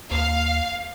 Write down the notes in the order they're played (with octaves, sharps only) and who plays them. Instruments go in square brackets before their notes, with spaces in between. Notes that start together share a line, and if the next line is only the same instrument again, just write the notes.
[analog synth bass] D#2 [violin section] F5